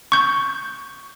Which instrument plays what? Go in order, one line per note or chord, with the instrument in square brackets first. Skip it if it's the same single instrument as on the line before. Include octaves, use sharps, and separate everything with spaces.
[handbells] C#6 G6